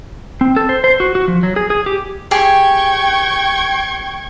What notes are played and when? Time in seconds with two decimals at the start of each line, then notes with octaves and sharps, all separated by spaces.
0.41 C4
0.56 A4
0.69 C5
0.84 C5
1.00 F#4
1.15 F#4
1.28 F3
1.43 F#3
1.56 G#4
1.70 G#4
1.86 G4
2.31 G4 G#4 G5 C#6 G#6